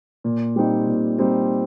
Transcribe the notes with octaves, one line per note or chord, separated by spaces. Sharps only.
A#2
G3 C4 D#4
A#2
G3 C4 D#4